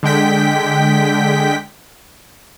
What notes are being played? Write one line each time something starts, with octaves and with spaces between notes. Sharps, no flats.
D3 G#3 G5 B6